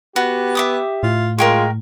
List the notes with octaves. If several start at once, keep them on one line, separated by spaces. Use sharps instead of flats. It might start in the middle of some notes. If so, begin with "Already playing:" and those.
B3 F#4 G4
E5 D6 D#6
A2 F4
G#3 F4 A#4 G5 C#6